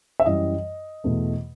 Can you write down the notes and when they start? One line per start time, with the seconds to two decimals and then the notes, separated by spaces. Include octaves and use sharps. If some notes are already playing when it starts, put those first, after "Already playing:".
0.20 E5
0.26 F#2 E3 G3 D#5
1.04 E2 B2 A3